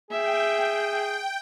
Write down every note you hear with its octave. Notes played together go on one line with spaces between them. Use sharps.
G#4 E5 G5